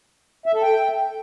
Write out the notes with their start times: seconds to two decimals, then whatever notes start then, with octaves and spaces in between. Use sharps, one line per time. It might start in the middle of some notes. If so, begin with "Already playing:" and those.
0.46 E5
0.54 A4
0.63 G5